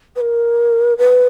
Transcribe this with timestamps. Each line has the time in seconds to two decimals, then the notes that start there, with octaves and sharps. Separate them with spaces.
0.16 B4
0.21 A#4
0.97 B4